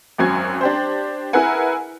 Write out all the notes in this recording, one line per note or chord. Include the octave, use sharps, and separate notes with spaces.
G#1 F#2 F#3 G#5 G#6
D4 G4 C5
E4 G#4 A#4 B4 F#5 G#5